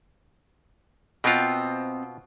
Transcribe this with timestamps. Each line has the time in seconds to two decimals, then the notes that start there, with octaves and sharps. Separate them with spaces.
1.24 B2 B3 C4 F4 D#5